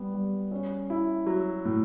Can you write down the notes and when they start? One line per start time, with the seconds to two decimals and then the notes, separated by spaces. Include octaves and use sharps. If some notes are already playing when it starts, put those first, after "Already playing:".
Already playing: G3 B3
0.14 G3
0.51 C#4
0.90 E4
1.27 F#3
1.65 A2